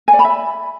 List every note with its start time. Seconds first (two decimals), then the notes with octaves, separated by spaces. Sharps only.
0.08 G#5
0.13 D5
0.19 B5
0.25 E5